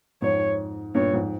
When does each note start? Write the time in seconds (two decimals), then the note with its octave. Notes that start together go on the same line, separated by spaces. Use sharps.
0.22 F2 G#2 C#5
0.95 G2 A#2 C#5
1.13 F2 G#2